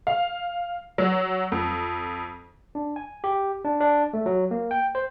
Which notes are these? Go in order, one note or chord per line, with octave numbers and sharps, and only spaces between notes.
F5
F#3
F2
D4
G#5
G4
D4
D4
A3
F#3
A#3
G5
C5